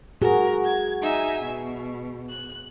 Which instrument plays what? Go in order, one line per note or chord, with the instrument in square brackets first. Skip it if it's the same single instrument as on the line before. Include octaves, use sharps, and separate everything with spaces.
[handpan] F#4 G#4 [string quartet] A#4
[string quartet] G#6
D#4 E5 G#5
B2
F#6